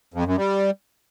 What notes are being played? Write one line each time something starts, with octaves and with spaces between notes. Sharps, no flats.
F2
F#2
G3